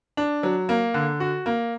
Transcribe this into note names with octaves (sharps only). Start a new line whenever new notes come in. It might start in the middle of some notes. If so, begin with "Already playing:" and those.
D4
F#3
A#3
D3
F#4
A#3